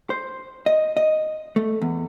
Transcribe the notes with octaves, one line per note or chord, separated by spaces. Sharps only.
C5
D#5
D#5
A3
E2